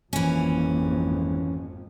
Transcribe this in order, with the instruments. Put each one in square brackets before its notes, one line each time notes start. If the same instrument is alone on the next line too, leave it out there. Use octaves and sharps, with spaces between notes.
[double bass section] G#1 F2 [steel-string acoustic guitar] E3 C#4 [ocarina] A#3